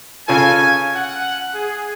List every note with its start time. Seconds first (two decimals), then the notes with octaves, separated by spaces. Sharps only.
0.28 C#3 F4 A4 G#5
0.95 F#5
1.54 G#4